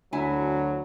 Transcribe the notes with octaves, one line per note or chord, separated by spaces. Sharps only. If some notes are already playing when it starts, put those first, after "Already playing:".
D2 F#3 E4 G#5